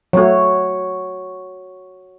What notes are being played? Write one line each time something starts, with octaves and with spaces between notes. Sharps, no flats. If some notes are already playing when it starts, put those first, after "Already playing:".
F#3 A3 F#4 C#5